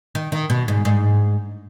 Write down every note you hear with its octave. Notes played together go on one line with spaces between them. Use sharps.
D#3
D#3
B2
G#2
G#2